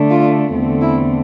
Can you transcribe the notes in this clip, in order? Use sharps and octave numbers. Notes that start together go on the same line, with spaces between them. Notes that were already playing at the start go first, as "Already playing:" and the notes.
Already playing: D3 A3 D4
F4
E2 D3 A3 C4
E4